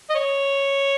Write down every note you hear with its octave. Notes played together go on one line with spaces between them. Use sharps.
D#5
C#5